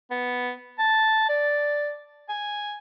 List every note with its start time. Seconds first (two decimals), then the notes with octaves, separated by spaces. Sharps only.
0.11 B3
0.79 A5
1.29 D5
2.29 G#5